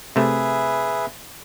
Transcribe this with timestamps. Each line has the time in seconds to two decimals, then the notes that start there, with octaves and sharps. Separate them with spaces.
0.16 C3 A3 G#4 B4 E5